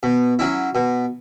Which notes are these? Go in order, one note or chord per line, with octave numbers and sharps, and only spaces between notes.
B2
F#3 C#4 E4
B2